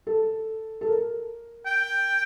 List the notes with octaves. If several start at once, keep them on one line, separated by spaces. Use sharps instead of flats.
A4
A4
A#4
G5